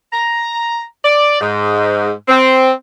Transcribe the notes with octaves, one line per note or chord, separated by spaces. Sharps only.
A#5
D5
G#2
C4